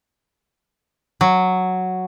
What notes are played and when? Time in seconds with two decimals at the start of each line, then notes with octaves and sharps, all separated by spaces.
1.21 F#3